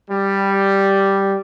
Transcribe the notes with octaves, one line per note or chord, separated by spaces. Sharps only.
G3